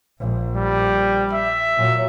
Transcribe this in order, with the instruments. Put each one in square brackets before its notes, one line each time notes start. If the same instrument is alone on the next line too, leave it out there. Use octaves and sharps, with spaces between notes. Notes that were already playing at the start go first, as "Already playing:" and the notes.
[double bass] A#1
[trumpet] G3
E5
[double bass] A#2 F#3